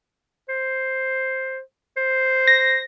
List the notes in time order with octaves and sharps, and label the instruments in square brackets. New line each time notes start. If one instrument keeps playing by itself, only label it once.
[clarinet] C5
C5
[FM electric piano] A#6